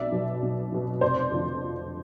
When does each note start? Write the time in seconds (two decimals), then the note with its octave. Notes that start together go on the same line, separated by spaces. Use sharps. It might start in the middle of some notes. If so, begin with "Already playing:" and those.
Already playing: B1 D5 E5
0.12 B2 F#3
0.42 B1
0.72 B2 F#3
1.01 F1 C5 D5
1.31 F2 D3 F3
1.62 F1